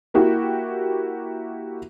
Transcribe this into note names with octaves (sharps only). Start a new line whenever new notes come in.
A#3 E4 F#4 G4